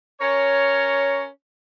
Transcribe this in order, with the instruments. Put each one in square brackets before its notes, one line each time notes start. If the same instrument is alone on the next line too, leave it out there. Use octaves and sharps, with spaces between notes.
[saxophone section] C#4 A#4 C#5